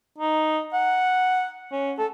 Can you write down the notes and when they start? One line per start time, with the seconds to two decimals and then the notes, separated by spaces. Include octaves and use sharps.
0.18 D#4
0.73 F#5
1.72 C#4
1.98 A4